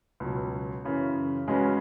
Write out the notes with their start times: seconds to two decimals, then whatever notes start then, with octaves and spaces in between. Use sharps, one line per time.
0.20 C#2 B2 F#3
0.84 F#2 C#3 E3
1.48 C#3 G#3 C#4 F#4 B4